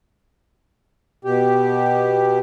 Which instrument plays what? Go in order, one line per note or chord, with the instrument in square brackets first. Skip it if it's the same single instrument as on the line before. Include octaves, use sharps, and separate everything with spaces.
[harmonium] B2 G4